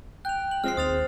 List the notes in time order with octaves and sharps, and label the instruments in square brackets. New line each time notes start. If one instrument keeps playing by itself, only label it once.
[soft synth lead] G5 [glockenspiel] F#6 F7
[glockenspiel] F#7
[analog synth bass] F3 [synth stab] G#3 C4 [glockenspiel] F6 C7
[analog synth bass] D#2 [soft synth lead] C5 [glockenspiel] D#6 A6 F7